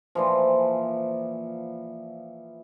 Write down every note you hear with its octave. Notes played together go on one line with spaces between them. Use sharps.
A#2 E3 F3